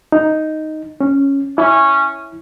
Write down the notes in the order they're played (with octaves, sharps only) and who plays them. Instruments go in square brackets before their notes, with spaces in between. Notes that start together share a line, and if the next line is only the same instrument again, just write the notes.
[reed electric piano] D#4
C#4
[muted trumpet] C#4 [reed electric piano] E4